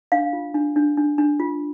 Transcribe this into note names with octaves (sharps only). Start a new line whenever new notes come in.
D4 F5
F4
D4
D4
D4
D4
F4